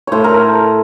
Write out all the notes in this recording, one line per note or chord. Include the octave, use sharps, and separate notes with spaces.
A2 C5 C#5
A#4